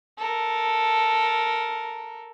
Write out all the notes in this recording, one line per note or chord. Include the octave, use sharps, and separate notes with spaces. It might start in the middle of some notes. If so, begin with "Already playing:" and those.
A4 A#4